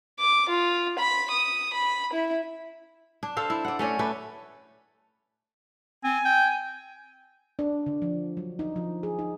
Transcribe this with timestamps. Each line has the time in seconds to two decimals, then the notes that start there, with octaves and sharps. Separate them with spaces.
0.19 D6
0.49 F4
0.98 B5
1.30 D#6
1.73 B5
2.13 E4
3.23 D4
3.37 A4 C5 F5
3.50 E4
3.65 D5 F#5
3.79 A3 C#4 C#5 D5
3.99 A3 D4 B4
6.04 C4 G#5
6.25 G5
7.59 D4
7.86 D3
8.02 F3
8.37 F#3
8.59 D#4
8.76 F3
9.03 G#4
9.19 D#4